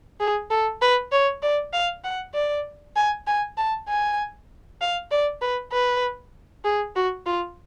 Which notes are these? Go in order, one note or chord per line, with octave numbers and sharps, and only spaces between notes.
G#4
A4
B4
C#5
D5
F5
F#5
D5
G#5
G#5
A5
G#5
F5
D5
B4
B4
G#4
F#4
F4